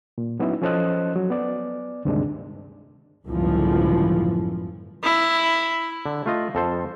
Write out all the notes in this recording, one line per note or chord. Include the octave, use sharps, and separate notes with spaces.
A#2
F#3 B3 C#4 D#4 E4
F3 C#4 A4 C5 D#5 F#6
F#3
B3 D5
D2 G2 C3 D#3 G#3 D4
G1 C#2 F#2 A2 E3 F3
E4
D3
A3 F4 D#5
F2 A4 C5